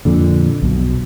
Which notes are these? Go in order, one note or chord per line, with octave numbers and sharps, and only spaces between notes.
F2 A#2 D3
B1 B2